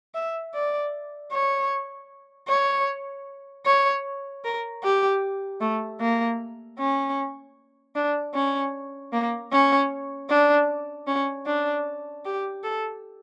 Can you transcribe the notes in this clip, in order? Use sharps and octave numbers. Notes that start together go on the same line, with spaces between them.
E5
D5
C#5
C#5
C#5
A#4
G4
A3
A#3
C#4
D4
C#4
A#3
C#4
D4
C#4
D4
G4
A4